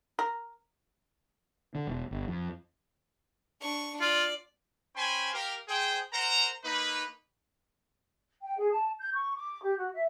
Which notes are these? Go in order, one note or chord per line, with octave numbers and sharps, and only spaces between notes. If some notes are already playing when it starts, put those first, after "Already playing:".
A#4
D3
E1
G1
F2
D4 C#6
F4 D5
C#4 C5 G5 G#5 B5 C6
G4 A#4 F5
G#4 C5 G5
A#4 C5 F#5 A#5
A#3 D#4 B4
G5
G#4
A5
G6
C#6
D6
G4
F#4
E5